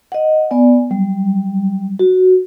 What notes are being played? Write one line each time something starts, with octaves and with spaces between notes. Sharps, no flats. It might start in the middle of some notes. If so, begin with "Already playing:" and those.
D#5 F#5
B3 D5 G#5
F#3 G3
F#4